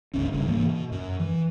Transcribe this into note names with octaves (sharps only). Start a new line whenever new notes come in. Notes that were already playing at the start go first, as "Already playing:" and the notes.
G1 C#2 C#4
D#1 G2 C#3
G#2 E3 A#3
B2
F#2
E3